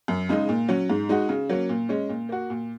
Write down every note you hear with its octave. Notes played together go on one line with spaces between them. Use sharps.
F#2
C#3 G#3 D#4
A#2
F#3 C#4
G#2
G#3 D#4 F#4
C#3
F#3 A#3 C#4
A#2
G#3 C#4
A#2
A#3 F#4
A#2